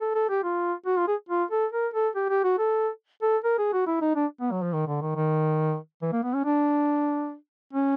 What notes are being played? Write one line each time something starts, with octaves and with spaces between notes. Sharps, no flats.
A4
A4
G4
F4
F#4
F4
G#4
F4
A4
A#4
A4
G4
G4
F#4
A4
A4
A#4
G#4
F#4
E4
D#4
D4
B3
F#3
F3
D#3
D3
D#3
D#3
E3
A#3
B3
C#4
D4
C#4